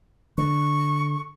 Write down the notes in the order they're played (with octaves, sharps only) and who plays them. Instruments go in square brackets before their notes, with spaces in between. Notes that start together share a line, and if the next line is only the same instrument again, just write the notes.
[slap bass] D3 [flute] C#6